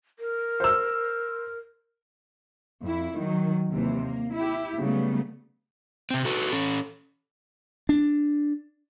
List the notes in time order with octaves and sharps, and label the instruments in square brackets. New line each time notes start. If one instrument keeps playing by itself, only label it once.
[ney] A#4
[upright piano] C5 E6
[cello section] F2 E4
D#3 F#3
D#2 C3 E3
A#3
E4 G4
C#3 F#3 G3 A3 B3
[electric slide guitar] C3 C4
F#4 A4 B4
C#4 A4
[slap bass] D4